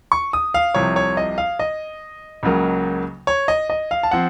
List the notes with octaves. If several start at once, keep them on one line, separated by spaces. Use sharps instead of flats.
C#6
D#6
F5
C2 C3 F3 C#5
C#5
D#5
F5
D#5
C#2 C#3 F#3 A#3
C#5
D#5
D#5
F5
A5
F3 C4 F#5